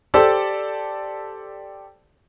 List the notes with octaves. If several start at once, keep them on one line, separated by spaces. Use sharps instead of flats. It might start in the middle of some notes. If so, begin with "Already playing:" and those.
G4 A4 C5 D5 A5 E6